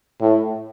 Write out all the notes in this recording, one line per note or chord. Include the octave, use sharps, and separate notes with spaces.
A2